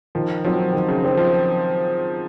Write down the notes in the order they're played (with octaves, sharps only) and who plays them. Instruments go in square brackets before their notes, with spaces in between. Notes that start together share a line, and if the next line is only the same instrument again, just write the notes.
[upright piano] D#3 [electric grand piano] F3
[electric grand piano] F3 [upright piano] F#3 C4
[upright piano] D#3
[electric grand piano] C#3
[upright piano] F#3 C4
[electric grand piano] F3